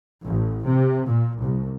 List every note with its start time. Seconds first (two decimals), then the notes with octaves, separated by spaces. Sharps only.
0.24 A1
0.65 C3
1.05 A#2
1.42 C2